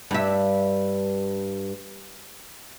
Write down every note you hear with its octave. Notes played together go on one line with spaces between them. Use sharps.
G2 E5